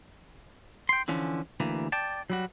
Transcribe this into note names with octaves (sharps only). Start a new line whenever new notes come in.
G5 C6
D3 E3 F3 C#4
D2 E3 A#3
D5 G5 A5
F#3 G3 F#4